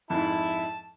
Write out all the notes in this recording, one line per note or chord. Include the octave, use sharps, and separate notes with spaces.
F2 G#2 E4 A5